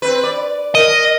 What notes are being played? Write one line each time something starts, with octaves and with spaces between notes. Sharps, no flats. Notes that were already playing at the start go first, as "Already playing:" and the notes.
C4 B4
D5
A#4 D#5